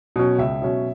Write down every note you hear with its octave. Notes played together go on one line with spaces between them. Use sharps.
B2 F#3 C#4
C#2 E5
B2 F#3 C#4